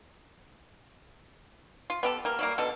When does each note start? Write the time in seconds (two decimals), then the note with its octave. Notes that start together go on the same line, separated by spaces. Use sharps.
1.90 F4
2.03 B3 G4 A4
2.25 A#3 G4 A#4
2.39 F#3 G3 A#3
2.58 B2 D3 A4